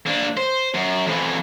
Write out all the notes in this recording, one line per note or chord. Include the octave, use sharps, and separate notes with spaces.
A#3 D4
C5
F#2
F2 E3